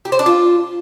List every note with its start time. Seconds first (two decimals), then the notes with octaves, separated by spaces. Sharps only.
0.05 G4
0.12 C5
0.19 D4
0.26 F4